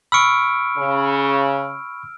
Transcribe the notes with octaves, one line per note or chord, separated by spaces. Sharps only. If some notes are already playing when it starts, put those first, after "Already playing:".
B5 C#6 E6 F6 D7
C#3